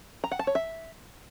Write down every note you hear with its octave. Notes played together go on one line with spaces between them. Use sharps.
A#5
F#5
A5
C#5
E5